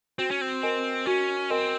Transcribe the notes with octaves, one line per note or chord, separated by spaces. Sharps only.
C4 F#4
C#4
C4
A#4 D#5 G#5
C#4 F#4
C4 A#4 D#5 G#5